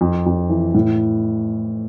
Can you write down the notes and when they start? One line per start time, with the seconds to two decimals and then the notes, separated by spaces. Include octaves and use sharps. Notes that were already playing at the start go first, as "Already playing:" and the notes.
0.01 F2
0.26 F2
0.50 E3
0.75 A2